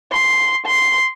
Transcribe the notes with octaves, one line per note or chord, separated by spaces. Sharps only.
C6
C6